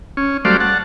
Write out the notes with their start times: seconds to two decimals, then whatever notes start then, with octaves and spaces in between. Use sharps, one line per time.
0.17 C#4
0.45 F#3 G3 A3 C5 D5 F5
0.60 F#5 A5